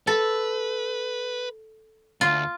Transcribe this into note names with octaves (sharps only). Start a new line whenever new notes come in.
A4 B4
D2 F4